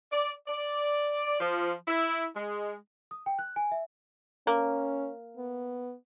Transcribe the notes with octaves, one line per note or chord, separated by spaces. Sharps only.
D5
D5
F3
E4
G#3
D#6
G5
F#6
G#5
E5
A#3 C#4
B3